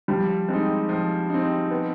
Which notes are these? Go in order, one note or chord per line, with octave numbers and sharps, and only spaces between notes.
F3 G3
G#3 C4 D#4
F3
C4 D#4
B3